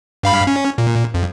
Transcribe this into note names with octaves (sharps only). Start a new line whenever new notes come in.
G2 F5 B5
C#4
A#2
F2